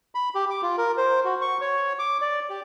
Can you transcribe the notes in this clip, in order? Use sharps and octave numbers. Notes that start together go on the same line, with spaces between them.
B5
G4
D6
F4
A#4
C5
F#4
C#6
C#5
D6
D5
G4